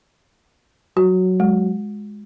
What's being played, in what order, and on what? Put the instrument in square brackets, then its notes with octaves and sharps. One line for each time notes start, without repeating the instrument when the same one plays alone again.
[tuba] F#3 [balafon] F#4
[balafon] G#3